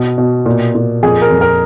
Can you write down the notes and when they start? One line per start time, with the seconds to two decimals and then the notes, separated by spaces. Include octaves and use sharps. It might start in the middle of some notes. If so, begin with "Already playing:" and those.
Already playing: B2
0.18 B2
0.46 A#2
0.75 A#2
1.03 F2 G#4
1.22 A#4
1.31 F2
1.41 A#4